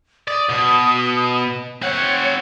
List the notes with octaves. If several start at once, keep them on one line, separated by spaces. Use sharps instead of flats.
D5 D#6
B2
C4 C#5 F#5